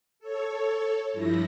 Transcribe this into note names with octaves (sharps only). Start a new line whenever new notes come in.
A4 C#5
G2 F3 E4 A#6